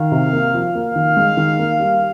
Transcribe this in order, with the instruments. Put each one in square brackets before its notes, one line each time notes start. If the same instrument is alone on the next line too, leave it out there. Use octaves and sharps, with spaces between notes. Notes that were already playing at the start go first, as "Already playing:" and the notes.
Already playing: [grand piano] D#3 [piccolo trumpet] F5
[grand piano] C3
A#3
F3
[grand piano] A#3 [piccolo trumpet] F5
[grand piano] D#3
G#3
D#3
A#3
G3